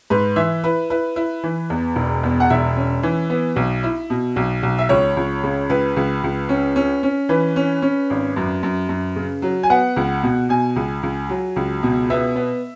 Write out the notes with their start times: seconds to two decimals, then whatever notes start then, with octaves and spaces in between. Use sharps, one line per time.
0.10 G#2 B4
0.36 E3 E5
0.64 E4 B4
0.90 E4 B4
1.16 E4
1.44 E3
1.70 E2
1.96 E1
2.24 E2
2.40 F#5
2.50 E1 E5
2.76 C#4
3.03 E3
3.30 B3
3.56 B1
3.83 E4
4.10 B2
4.36 B1
4.63 B1
4.79 E5
4.89 C#2 C#5
5.17 C#2
5.44 C#3
5.69 C#2 B4
5.96 C#2
6.24 C#2
6.49 C#4
6.76 C#4
7.03 C#4
7.29 E3 B4
7.56 C#4
7.82 C#4
8.10 G#1
8.36 F#2
8.63 F#2
8.89 F#2
9.16 C#3
9.42 F#3
9.63 G#5
9.70 B3 F#5
9.96 C#2
10.23 B2
10.49 B2 G#5
10.76 C#2
11.03 C#2
11.29 F#3
11.56 C#2
11.83 B2
12.10 B3 E5
12.36 B3